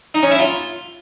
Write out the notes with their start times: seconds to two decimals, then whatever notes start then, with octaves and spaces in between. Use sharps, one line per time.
0.14 D#4
0.23 C#4
0.31 E4
0.39 F4